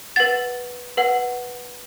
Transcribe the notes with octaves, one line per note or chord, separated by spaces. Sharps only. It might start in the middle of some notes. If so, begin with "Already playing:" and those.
B4 F#5 A6
B4 F#5